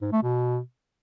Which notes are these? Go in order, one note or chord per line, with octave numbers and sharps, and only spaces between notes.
G#2
A3
B2